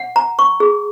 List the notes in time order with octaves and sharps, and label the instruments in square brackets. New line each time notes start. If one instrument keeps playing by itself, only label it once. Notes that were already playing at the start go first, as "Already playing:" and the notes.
Already playing: [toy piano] F#5
A#5
C#6
G#4